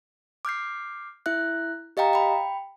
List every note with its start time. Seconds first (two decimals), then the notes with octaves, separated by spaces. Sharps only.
0.45 D6 F6 G6 C7
1.26 E4 E5 F#6
1.97 G4 D#5 F5 G5 A#5
2.13 G5 B5